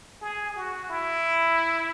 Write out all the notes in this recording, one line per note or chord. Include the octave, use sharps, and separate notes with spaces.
G#4
F#4
E4